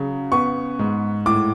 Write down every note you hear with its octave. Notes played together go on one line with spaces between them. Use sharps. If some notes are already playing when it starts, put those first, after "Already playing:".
Already playing: C#3 F#3
B3 C#6
G#2
A2 D6